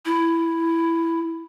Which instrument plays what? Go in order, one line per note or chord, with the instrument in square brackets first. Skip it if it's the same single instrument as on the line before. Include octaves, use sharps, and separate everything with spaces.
[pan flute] E4